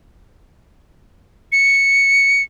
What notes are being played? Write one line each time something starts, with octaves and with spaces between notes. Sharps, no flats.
C#7